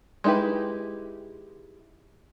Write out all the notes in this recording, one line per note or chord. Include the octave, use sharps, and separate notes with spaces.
G#3 D#4 E4 G4 B4